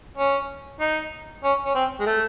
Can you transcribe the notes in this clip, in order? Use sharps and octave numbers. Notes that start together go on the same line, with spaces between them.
C#4
D#4
C#4
C#4
C4
G#3
A3